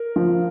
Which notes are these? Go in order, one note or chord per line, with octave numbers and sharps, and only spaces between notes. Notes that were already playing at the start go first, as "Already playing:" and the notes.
Already playing: A#4
F3